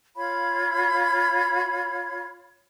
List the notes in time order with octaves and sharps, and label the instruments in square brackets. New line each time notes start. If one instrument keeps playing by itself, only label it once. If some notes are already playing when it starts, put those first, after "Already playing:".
[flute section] F4 C#5 F5 B5